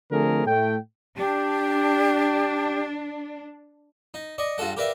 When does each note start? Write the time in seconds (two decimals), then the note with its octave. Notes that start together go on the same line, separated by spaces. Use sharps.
0.12 D3 F3 A3 C4 G#4 A#4
0.46 A2 A3 G5
1.17 D4 G4
4.14 D#4
4.38 D5 D#5 C#6
4.58 G2 F4 F#4 A4 F#5
4.77 G4 A#4 B4 D5 E5 F5